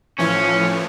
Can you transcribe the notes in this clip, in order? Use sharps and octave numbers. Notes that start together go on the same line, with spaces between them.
A2 E3 F3 C#4